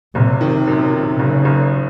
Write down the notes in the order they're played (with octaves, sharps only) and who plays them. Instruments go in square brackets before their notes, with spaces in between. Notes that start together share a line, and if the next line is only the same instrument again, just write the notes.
[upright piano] F#1 [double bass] C3
[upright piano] D#3
F#2
D#3
[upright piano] F#1 [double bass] C#3
[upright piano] F#1